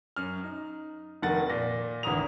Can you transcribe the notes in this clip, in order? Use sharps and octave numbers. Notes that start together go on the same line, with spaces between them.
F#2 F6
D#4
F1 D#3 A3 A#4 F#5 A6
A#2 A#6
G#1 D2 E3 A#5 D#6 F7